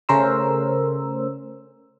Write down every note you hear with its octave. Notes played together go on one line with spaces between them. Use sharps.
C#3 A3 C#4 A#4 C5 E6